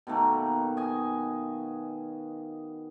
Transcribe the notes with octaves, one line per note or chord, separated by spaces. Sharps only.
B2 D#3 A3 A#3
D#5 G#5